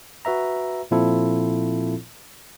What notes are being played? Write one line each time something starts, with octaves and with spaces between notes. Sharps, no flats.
F#4 B4 E5 A#5
A#2 F3 C4 E4 F4 A4